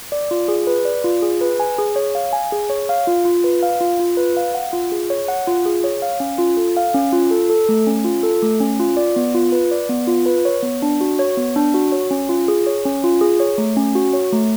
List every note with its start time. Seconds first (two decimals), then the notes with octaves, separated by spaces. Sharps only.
0.12 D5
0.31 F4
0.48 G#4
0.67 B4
0.85 D5
1.04 F4
1.22 G#4
1.41 B4
1.60 G#5
1.78 G#4
1.96 C#5
2.15 F5
2.33 G#5
2.52 G#4
2.70 C#5
2.89 F5
3.07 F4
3.25 F4
3.44 B4
3.62 F5
3.81 F4
3.99 F4
4.17 B4
4.37 F5
4.55 F#5
4.73 F4
4.92 G#4
5.10 C#5
5.28 F#5
5.47 F4
5.66 G#4
5.84 C#5
6.02 F5
6.20 C#4
6.39 F4
6.57 A4
6.77 F5
6.94 C#4
7.13 F4
7.31 A4
7.50 A4
7.69 A3
7.87 C#4
8.04 F4
8.23 A4
8.42 A3
8.60 C#4
8.79 F4
8.97 D5
9.16 B3
9.35 F4
9.52 B4
9.71 D5
9.89 B3
10.07 F4
10.26 B4
10.45 C#5
10.63 B3
10.82 D4
11.01 F#4
11.19 C#5
11.37 B3
11.56 D4
11.74 F#4
11.92 C#5
12.11 C#4
12.29 F4
12.48 G#4
12.67 C#5
12.85 C#4
13.04 F4
13.21 G#4
13.40 C#5
13.58 A3
13.77 C#4
13.95 F#4
14.14 C#5
14.32 A3